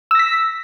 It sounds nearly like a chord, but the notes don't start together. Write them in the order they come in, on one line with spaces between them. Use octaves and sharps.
E6 A#6 B6